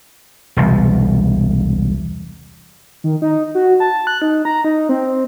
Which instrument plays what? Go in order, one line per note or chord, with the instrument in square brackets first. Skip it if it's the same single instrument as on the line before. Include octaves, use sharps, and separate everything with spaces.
[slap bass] E1 C2
[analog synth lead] D#3
D#4
F#4
A5
F#6
D#4
A#5
D#4
C4